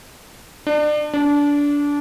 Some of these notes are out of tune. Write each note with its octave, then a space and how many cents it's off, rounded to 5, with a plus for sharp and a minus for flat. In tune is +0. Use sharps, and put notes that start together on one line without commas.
D4 +35
D4 -20